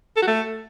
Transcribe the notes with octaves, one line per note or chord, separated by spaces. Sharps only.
A4
F#4
A3